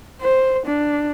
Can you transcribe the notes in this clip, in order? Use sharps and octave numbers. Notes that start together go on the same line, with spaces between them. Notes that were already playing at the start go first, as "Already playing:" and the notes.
C5
D4